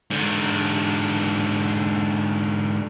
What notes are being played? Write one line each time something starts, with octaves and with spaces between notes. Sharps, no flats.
G#2 D3